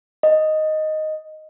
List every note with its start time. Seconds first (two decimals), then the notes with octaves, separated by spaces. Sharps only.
0.23 D#5